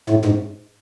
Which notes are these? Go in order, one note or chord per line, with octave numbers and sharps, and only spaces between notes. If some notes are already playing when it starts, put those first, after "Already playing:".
A2
G#2